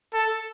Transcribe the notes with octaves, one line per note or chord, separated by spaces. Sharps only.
A4